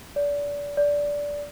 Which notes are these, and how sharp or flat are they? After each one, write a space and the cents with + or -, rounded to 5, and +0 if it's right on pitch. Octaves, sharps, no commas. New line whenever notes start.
D5 -30
D5 -15